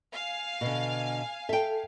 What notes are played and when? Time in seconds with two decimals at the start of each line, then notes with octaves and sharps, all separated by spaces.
0.14 F5 G#5
0.61 B2 D3
1.49 A4 E5 G5